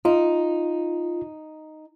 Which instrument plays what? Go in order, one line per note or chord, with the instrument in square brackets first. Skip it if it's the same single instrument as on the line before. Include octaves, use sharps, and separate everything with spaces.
[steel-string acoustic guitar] D#4 [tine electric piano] F4